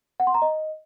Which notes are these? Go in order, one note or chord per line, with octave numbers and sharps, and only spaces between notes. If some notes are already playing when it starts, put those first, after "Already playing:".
F#5
C6
A#5
D#5